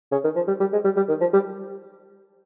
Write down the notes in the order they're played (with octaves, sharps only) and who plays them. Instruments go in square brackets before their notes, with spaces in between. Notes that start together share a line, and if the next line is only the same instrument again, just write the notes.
[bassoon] C#3
D#3
F3
G3
G3
G#3
G3
G3
D#3
F3
G3